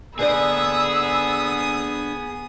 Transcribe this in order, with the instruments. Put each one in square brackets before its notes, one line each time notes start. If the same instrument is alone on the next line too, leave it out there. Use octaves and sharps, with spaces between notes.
[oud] D3 C5 D5 [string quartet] B3 D#6 [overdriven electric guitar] G#4 [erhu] E6